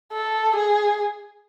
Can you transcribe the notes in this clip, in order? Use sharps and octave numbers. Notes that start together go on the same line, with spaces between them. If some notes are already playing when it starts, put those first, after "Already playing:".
A4
G#4